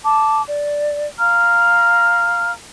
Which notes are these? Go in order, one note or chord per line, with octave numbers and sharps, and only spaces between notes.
A5 D6
D5
F5 A#5 F6